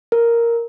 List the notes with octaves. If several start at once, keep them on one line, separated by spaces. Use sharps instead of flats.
A#4